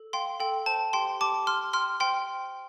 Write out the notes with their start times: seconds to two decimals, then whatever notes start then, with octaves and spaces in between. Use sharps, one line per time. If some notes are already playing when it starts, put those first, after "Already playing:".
Already playing: A4
0.13 F5 G5 C6
0.40 A4 G5
0.66 C5 A5
0.93 G4 G5 C6
1.20 G4 A5 D6
1.47 G5 C6 F6
1.73 G5 C6 F6
2.00 C5 G5 C6